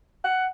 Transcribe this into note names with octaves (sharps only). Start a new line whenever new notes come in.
F#5